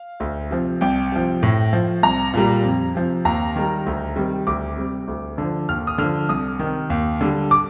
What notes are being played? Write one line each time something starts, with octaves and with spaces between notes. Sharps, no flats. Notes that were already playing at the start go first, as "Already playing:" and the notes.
Already playing: F5
D2
C3 F3
C2 G5
C3 F3
A2
F3
C2 A#5
A#2 G3
F2
C3 F3
D#2 A#5
D#3 G3
D2
C3 D#3 G3
D2 D6
C3 G3
D2
D3 F3
D#2 F6
D#6
D3 F3 F6
C2 D#6
C3 D#3
D#2
D3 G3
D6